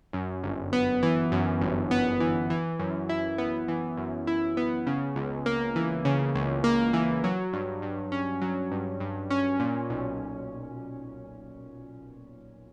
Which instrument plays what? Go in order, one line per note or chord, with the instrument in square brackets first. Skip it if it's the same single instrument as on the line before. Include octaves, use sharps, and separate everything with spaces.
[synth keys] F#2
G1
B3
E3
F#2
G1
B3
E3
E3
F#2
E4
B3
E3
F#2
E4
B3
C#3
C#2
A#3
E3
C#3
C#2
A#3
E3
F#3
G2
G2
C#4
F#3
G2
G2
C#4
A#2
B1